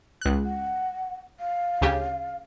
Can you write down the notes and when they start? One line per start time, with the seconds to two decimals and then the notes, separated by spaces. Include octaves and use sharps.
0.21 C#2 F#6
0.45 F#5
1.40 F5
1.81 D2 C#3 G4